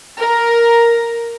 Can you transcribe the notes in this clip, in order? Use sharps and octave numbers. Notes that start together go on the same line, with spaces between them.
A#4